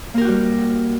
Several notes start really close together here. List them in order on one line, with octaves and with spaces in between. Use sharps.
A#3 A#4 G4 F#4 G3